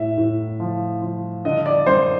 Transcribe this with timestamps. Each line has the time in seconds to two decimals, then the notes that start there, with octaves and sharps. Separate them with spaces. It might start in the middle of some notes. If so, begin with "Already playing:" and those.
Already playing: A2 E5
0.18 A2
0.60 F3
1.02 F3
1.45 D3 D#5
1.66 D5
1.86 F#2 C5